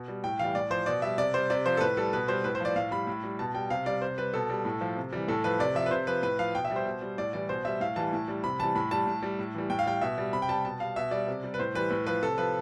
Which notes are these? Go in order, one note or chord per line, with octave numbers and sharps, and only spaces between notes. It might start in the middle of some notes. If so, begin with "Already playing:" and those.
Already playing: B2
G3
A2 G5
E3 G3 F5
A2 D5
F3 C5
B2 D5
G3 E5
C3 D5
G3 C5
C3 D5
F3 C5
A4
A2 B4
G3 A4
B2 B4
G3 C5
A2 B4
C5
F3 D5
A2 F5
G3 B5
A2
G3
B2 A5
G3 G5
C3 F5
G3 D5
C3 C5
G3 B4
B2 A4
G3
A2
F3
C3
E3 G3
A2 A4
F3 B4
C3 D5
F3 E5
B4
C3 C5
F3 B4
A2 B4
F3 F5
B2 G5
E5
G3
C5
B2
G3
A2 D5
E3 G3 D5
B2 C5
G3 E5
A2 F5
E3 G3 A5
A2
G3
C3 B5
E3 G3 A5
A2 B5
G3 A5
A2
G3
A2
E3 G3
A2 G5
F5
G3 G5
B2 E5
G3
C3 B5
G5
G3 A5
B2 A5
G3 F5
B2 E5
G3 D5
C3
G3
B4
A2 C5
E3 G3 B4
A2 B4
F3 B4
C3 A4
F3 B4